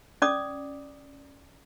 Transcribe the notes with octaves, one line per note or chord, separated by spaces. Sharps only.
C#4 D5 D6 D#6